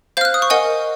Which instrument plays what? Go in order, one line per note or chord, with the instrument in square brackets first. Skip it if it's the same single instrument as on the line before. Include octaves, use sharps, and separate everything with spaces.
[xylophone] C5 F5 F6 G6
F#6
D#6
C#6
A#4 D#5 F#5 G#5